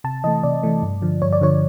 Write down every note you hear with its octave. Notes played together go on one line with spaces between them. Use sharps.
C3 A5
E3 A3 D#5
C3 D5
E3 A3
G2
D3 F3
G2 C#5
D5
D3 F3 C#5